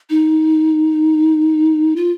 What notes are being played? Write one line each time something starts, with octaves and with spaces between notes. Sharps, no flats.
D#4
F4